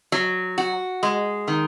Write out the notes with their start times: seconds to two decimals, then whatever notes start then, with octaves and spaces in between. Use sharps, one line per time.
0.12 F#3
0.58 F#4
1.03 G#3
1.48 D#3